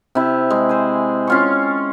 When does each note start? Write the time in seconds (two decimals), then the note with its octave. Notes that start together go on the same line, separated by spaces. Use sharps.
0.15 C3 E4
0.50 G#3
0.69 C5 G#5
1.27 C#4 F4 C#6